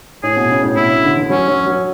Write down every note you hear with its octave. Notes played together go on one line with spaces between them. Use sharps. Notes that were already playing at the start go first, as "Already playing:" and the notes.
A2 G#4
B2
C#3
A2
B2 E4
C#3
D3
E3
F#3 C#4
F#3
F#3